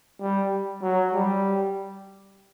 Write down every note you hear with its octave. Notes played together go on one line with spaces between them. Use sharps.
G3
F#3
G3